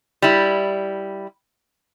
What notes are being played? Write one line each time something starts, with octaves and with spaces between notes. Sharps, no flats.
G3 E4